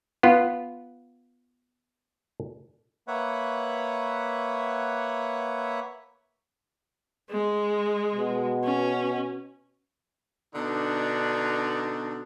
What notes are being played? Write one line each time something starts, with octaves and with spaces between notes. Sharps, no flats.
B3 F4
A#3 B4 C#5 E5 F#5
G#3
B2
C#4
B2 D3 D4 D#4